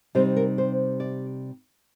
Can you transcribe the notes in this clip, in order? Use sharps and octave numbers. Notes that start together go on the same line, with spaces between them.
C3 G3 C4 D#4 C5
A#4
C5
D5